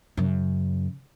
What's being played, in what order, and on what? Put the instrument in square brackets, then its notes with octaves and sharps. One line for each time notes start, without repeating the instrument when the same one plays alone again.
[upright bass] F#2 C#3